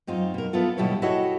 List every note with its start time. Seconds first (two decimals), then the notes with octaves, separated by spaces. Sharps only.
0.07 F#2 C4 D#4 F4
0.34 B2 A#4
0.53 B3 E4 F4 A4
0.77 D#2 B2 G3 E4 A4 C#5
1.02 E4 F#4 G4 A4 C#5 D#5